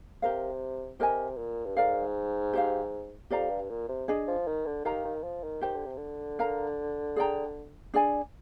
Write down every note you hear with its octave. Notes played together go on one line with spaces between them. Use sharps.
C3 G4 A#4 F5
C3 G4 A#4 D#5 G#5
A#2
G2
G#2 A#4 D5 F5
G4 C5 F5
F2 G4 D5 F5 A#5
G2
A#2
C3
D4 G#4 D#5
F3
D#3
D3
D#3 G4 A#4 F5 A#5
D#3
F3
D#3
D#3 G4 C5 G5
D3
C3
D3
A#4 F5 A#5
G#4 D5 G5 A#5
D4 G#4 D5 G#5